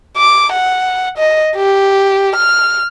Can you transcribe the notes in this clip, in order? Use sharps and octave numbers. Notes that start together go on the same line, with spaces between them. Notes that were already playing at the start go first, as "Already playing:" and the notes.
D6
F#5
D#5
G4
F6